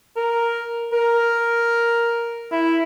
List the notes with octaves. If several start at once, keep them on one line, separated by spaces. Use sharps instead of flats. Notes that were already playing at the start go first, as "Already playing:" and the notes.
A#4
A#4
E4